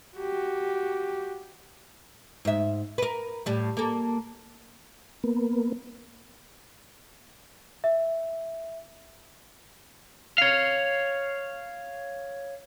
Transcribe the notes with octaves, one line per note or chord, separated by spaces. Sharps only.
F#4 G4
G#2 E5
A#4 B4
A2 G3
A#3 A4
A#3 B3
E5
C#5 F5